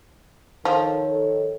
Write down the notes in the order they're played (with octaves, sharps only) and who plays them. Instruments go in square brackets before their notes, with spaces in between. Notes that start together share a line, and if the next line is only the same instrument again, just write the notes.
[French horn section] D#3 A4 C#5 [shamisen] F3